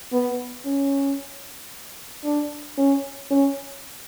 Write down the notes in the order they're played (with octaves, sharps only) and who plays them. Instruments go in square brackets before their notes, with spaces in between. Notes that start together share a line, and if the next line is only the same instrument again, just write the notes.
[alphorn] B3
C#4
D4
C#4
C#4